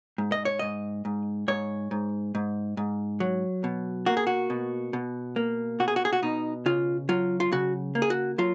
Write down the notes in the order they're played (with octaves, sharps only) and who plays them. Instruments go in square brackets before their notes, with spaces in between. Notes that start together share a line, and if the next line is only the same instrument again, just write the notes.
[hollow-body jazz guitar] G#2
D#5
C#5
G#2 D#5
G#2
G#2 C#5
G#2
G#2
G#2
F#3
B2
A#3 F#4
G#4
F#4
B2
B2
A#3
B2 F#4
G#4
F#4
G#4
F#4
B2 D#4
C#3 F4
F#3 F4
F4
C#3 F#4
A#3
G#4
F#4
F#3 F4